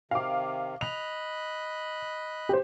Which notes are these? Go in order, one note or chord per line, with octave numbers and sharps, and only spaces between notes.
C3 D#3 F5 D6
D#5 B5 F#6 F7
G4 C5